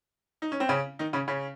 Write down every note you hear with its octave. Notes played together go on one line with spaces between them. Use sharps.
D#4
C#4
C4
C#3 C#4
D#3 D#4
C#3 C#4
C#3 C#4